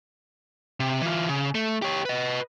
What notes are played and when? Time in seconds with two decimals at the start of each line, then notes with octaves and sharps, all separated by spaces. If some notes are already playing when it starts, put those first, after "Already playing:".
0.80 C3
1.02 E3 F4
1.29 C#3
1.55 A3
1.82 G4 C#5
2.05 B4 D#5